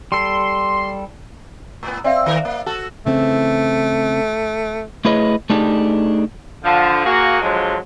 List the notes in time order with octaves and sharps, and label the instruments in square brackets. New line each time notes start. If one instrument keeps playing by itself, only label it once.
[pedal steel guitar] G3 A4 [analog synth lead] C6
[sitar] A2 B3
[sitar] C4 [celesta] D5 E5 F5
[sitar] D#3 A#4
A#3
F#4 A4
[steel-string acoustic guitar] C#3 E3 C4 [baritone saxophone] A3
[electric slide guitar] A3 E4 G#4 B4 C#5 D#5
A3 D4 D#4 G4 G#4
[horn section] D3 F3
A#3 F#4 G#4
D3 F3 F#3 G#3